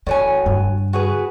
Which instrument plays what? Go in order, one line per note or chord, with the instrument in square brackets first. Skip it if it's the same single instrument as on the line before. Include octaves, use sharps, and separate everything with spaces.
[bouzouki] A2 F#3 G#5 [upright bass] E3
[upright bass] G2 D3
[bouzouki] F#4 G#4 B4